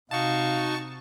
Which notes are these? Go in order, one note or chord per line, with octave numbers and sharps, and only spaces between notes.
C3 D#4 F#4 F5 A5 C#6